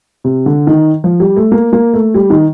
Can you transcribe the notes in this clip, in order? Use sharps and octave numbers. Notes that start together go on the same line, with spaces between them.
C3
D3
D#3
F3
G3
A3
A#3
A#3
A3
G3
D#3